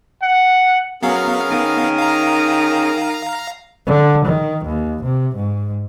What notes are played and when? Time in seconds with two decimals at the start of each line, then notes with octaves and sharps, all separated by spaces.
0.23 F#5
1.03 F#3 B3 C#4 G#4 A#4 F5
1.51 D#3
1.98 F5 A#5
3.87 D3
4.26 D#3
4.66 D#2
5.04 C3
5.35 G#2